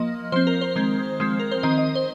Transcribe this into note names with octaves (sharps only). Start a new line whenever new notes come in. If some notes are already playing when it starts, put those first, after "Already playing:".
Already playing: F3 A#3 D#5
F3 C4 C5
A#4
C5
D#3 G#3 C4
F3 G#3 C4
A#4
C5
D#3 C4 D#5
D#5
C5